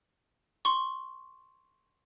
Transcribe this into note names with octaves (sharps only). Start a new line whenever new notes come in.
C6 C#6